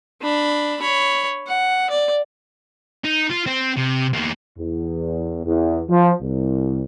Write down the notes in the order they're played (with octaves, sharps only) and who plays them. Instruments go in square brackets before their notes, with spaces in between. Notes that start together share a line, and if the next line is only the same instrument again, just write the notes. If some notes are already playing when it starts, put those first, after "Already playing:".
[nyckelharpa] D4 B5
C#5 B5
F#5
D5
[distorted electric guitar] D#4
F4
C4
C3
E2 A#3
[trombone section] E2
E2
F3
C2